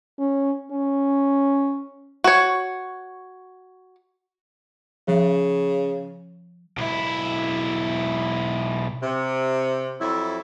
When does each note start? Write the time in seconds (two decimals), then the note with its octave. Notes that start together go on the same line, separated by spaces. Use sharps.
0.20 C#4
0.72 C#4
2.24 F#4 C#5
5.08 C#3 F3
6.78 B1 E4
9.02 C3
10.00 F2 F#3 E4